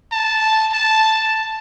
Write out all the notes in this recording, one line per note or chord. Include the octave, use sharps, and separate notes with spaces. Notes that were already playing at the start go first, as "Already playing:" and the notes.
A5
A5